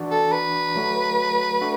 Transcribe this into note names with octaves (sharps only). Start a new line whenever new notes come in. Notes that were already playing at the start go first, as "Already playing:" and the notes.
Already playing: E3 D4 F#4 D5
A4
B4
F#3 A3 F#4
A3 D4 F#4